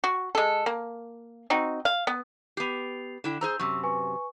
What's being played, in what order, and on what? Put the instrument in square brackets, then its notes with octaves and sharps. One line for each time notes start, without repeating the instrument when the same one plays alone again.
[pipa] F#4
G#3 A4
A#3
C4 D#4 F#4
F5
B3
[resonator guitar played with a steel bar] B3 G4 [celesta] C7 F7
[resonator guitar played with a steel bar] D3 E4 G5 [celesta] E7
[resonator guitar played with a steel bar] G#4 C5 A#5 [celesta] E6 G6
[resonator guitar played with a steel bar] F#2 C3 [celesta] C#6 E6
[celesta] B4 G#5 C#6